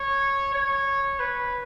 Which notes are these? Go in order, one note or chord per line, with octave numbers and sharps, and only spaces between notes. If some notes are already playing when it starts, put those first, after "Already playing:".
Already playing: C#5
C#5
B4